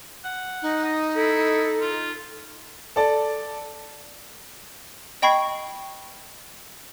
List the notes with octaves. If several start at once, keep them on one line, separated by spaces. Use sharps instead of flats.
F#5
D#4
D#5
E4 A4
F4
A4 D5 A5
D#5 G5 B5 C#6 G#6 C7